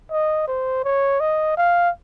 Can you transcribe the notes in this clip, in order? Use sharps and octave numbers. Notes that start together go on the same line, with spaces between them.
D#5
C5
C#5
D#5
F5